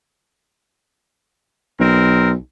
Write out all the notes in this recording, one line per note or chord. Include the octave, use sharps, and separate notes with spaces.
B1 C4 A#4